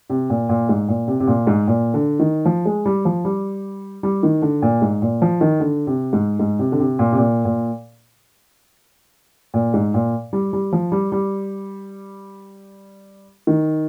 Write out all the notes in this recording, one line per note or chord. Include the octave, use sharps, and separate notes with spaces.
C3
A#2
A#2
G#2
A#2
C3
C3
A#2
G#2
A#2
D3
D#3
F3
G#3
G3
F3
G3
G3
D#3
D3
A#2
G#2
A#2
F3
D#3
D3
C3
G#2
G#2
C3
D3
C3
A#2
C3
A#2
A#2
A#2
G#2
A#2
G3
G3
F3
G3
G3
D#3